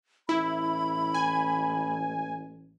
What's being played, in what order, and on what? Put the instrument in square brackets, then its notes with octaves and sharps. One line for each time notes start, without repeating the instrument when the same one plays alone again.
[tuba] A1 [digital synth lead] E4 [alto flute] B5
[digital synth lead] G#5